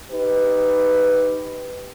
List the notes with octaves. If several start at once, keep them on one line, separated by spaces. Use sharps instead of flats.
D#4 G4 B4